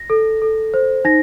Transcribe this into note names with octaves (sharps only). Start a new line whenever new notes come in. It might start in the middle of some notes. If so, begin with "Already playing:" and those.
Already playing: A#6
A4
A4
C5
D#4 A#6